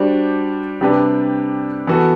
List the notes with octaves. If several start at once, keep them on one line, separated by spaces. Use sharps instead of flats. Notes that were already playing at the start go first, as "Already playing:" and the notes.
Already playing: G3 D4 F#4 C5
C3 G3 D4 G4 B4
E3 B3 F#4 A4